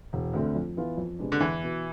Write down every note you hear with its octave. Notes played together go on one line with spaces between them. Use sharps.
E1
D2 D3 A3 C4
F2
E3 B3 F4
F2
C3 G#3 B3 D4
D3
E2 E3
B2 B3